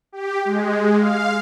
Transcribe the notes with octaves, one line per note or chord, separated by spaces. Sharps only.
G4
G#3
F5